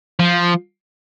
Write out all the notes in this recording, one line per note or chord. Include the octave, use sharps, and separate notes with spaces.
F3